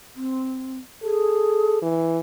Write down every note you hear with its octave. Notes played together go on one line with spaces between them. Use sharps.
C4
G#4 A4
E3